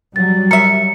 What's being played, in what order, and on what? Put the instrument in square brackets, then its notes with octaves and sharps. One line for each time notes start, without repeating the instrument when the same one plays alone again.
[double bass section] F#3 G3 [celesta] A6
[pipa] A#4 E5 [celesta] C#7